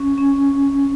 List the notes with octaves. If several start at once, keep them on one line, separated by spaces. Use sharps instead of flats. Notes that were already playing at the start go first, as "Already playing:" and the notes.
Already playing: C#4
C#4